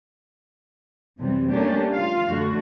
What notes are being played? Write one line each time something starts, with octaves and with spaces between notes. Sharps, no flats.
F#2 C3 E3 G3
G3 A3 A#3 C#4 D4 G4
F4 F5
F#2 D3 A3 F#4